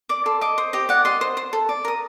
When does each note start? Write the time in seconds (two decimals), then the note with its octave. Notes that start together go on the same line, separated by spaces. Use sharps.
0.09 D5 D6
0.26 A4 C6
0.41 D#5 D6
0.58 C5
0.73 G4 D#5
0.89 D5 F#5
1.05 D#5 C6
1.21 C5
1.37 C5
1.53 A4
1.69 D5
1.85 A#4 D#6